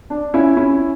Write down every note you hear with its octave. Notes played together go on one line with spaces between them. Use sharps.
D4
C#4 E4
C#4 E4